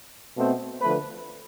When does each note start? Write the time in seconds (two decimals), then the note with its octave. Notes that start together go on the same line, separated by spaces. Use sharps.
0.36 B2 A3 C4
0.81 D3 F3 A3 B4